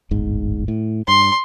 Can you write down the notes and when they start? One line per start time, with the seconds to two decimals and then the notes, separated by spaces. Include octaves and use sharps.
0.11 D1 G1 G#2
0.68 A2
1.08 G2 C6